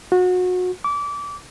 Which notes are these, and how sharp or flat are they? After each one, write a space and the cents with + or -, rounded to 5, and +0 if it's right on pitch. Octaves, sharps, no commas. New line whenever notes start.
F#4 -30
D6 -25